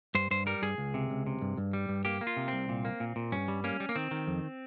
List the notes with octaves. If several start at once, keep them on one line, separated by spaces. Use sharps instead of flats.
G2 C5
G2 C5
G3 A#4
G2 G#4
C#2
C3
C#2
C3
G2
G2
G3
G2
A#3 G4
A#3
F4
C3
C2 C4
A#2
A#3
A#2
A#2
G2 C#4
G3
A#3 C#4
G3
A#3
D#3 C4
D#3
F2